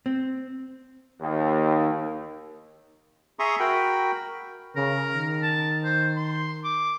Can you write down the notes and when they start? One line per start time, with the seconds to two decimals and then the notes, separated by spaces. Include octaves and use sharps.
0.06 C4
1.21 D#2
3.39 G#4 E5 A#5 C6 C#6 D#6
3.60 F#4 A#4 G5 B5
4.76 C#3 A#4
5.12 D#3
5.42 A5
5.84 C5
6.17 C6
6.64 D6